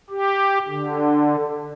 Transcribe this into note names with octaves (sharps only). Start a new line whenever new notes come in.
G4
D3